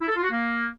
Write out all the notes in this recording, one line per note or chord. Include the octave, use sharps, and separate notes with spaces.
E4
A4
F4
F#4
A#3